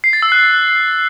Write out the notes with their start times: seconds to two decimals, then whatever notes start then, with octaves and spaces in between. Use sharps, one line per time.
0.04 C7
0.13 A6
0.22 E6
0.32 F#6